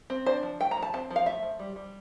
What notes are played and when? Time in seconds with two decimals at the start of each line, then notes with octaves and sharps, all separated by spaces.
0.10 C4
0.26 D4 C5
0.43 F3
0.60 A3 G5
0.71 A#5
0.77 F3
0.82 A5
0.93 C4 A5
1.10 F3
1.16 F5
1.26 A3 E5
1.43 F3
1.59 G3
1.76 G3